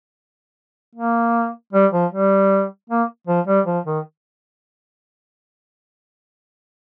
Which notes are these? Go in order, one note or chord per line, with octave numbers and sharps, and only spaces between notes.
A#3
G3
F3
G3
A#3
F3
G3
F3
D#3